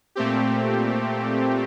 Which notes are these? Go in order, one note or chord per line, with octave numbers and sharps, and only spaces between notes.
A#2 A3 C4 G4